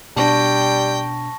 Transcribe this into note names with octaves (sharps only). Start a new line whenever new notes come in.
B2 G3 C4 D4 G5 A5 C#6 A#6